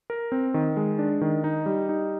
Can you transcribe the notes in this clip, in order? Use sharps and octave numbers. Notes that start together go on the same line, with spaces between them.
A#4
C4
D#3
G#3
D4
D#3
D#4
G3
D#4